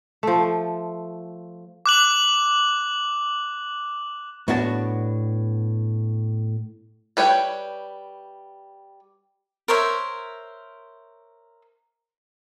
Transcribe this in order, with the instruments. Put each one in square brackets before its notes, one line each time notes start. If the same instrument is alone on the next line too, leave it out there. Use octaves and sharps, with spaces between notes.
[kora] F3 A3
[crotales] D6 F#6 F#7
[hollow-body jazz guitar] A2 B3 D4 F#4 A#4 A5
[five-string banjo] G3 B4 C#5 G5
[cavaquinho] A#4 C5 C#5 E5